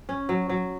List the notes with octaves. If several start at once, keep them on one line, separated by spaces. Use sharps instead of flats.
C#4
F#3
F#3